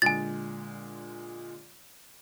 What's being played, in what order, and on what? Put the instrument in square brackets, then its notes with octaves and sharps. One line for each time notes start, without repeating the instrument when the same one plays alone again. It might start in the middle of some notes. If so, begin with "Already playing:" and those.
[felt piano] A#2 D3 G#3 [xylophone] G#5 A6